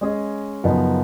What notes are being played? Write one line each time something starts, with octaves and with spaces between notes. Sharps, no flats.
G#3 C#4 G#4 D#5
F#2 C#3 F3 B3 D#4